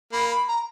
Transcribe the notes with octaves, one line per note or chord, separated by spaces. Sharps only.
A#3 B5
B5
A#5